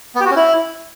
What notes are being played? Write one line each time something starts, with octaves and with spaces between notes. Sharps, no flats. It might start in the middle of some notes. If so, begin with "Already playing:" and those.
B3
G4
F#4
C#4
E4